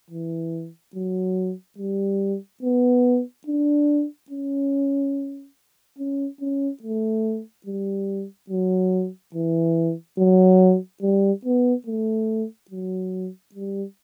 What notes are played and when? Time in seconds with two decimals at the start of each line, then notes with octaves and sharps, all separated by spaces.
0.10 E3
0.95 F#3
1.78 G3
2.63 B3
3.47 D4
4.31 C#4
5.99 C#4
6.41 C#4
6.83 A3
7.66 G3
8.50 F#3
9.35 E3
10.19 F#3
11.03 G3
11.45 B3
11.87 A3
12.71 F#3
13.55 G3